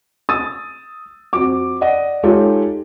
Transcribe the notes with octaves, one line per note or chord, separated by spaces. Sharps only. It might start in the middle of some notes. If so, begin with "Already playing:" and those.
D#6 E6 A6 D#7
F2 F#4 D6
D5 D#5 F#5
G#3 D#4 F4 G4 A4 C#5